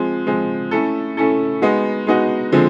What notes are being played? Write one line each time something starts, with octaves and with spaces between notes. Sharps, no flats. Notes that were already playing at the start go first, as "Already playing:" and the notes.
Already playing: F3 G#3 C4
F3 G#3 C4
A3 C#4 E4 A4
A3 C#4 E4 A4
G#3 B3 D#4 F#4
G#3 B3 D#4 F#4
D3 F3 G#3 C4